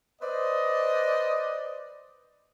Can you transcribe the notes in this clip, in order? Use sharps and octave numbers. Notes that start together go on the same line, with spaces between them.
B4 C5 D5 D#5